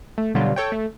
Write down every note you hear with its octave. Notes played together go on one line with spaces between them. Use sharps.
A3
B2 D3 F#3 G3 F4
A4 C#5 G5
A3